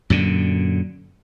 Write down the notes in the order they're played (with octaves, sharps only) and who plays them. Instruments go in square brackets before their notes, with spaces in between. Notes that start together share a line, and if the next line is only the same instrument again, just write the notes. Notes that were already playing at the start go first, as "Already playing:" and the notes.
[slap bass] F#2 A#2 D3